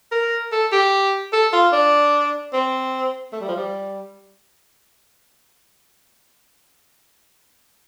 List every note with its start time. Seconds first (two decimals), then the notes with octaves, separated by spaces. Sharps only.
0.12 A#4
0.52 A4
0.72 G4
1.33 A4
1.53 F4
1.72 D4
2.53 C4
3.33 A3
3.41 G3
3.48 F3
3.57 G3